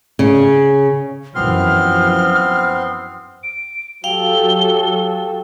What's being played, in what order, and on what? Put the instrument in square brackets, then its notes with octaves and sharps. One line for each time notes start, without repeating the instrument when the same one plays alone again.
[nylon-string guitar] C#3
[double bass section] F#2 E3 F3 [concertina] B3 C4 C6 [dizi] F6
[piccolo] D7
[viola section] F#3 G4 A4 [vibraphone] F5 G5 [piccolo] G7